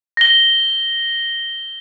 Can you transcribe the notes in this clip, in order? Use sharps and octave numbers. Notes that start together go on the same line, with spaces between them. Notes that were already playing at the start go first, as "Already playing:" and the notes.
A#6 G7